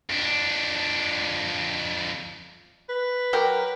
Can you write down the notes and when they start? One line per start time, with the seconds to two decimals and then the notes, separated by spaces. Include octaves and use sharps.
0.10 F2 D4
2.89 B4
3.33 F#3 G4 A#4